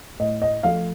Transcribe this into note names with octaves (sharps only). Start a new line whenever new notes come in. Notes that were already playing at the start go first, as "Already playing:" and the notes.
A2 D#5
D#5
F3 A3 F5